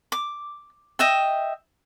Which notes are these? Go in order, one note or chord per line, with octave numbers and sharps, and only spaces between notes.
D6
D#5 E5 G5